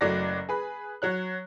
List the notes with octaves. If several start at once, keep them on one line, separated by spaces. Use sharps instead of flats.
F#1 F#3 A3 D5 A#6
G#4 B4
F#3 C#5 F#6